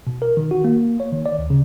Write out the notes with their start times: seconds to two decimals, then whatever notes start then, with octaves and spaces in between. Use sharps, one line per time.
0.07 B2
0.22 A#4
0.37 D#3
0.51 F#4
0.64 A#3
1.00 C#5
1.12 D#3
1.26 D5
1.39 D2
1.50 C#3